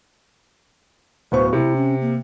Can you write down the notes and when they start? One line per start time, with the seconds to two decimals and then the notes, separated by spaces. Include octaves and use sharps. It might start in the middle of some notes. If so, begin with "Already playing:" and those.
1.32 D1 B3 C5 C#6
1.53 C3 E4
1.76 C#4
2.01 A#3